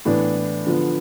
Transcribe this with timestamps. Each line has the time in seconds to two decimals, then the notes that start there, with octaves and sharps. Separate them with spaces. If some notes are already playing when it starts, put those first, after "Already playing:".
0.05 A2 E3 B3 D4
0.67 D3 F3 B3